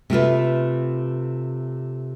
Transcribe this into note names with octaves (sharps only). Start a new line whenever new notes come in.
C3 A3 F4 B4